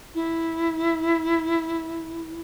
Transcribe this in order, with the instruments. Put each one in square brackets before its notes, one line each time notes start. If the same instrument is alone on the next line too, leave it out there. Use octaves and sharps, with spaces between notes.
[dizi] E4